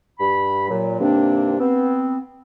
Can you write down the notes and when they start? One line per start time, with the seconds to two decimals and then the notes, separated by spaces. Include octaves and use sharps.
0.20 G2 B5
0.69 A#2 F#3
1.00 G2 C3 D#3 A#3 C4 D4
1.60 B3 C4